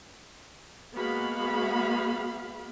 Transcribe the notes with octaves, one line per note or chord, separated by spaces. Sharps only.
G#3 A#3 B3 F#4 F5 B5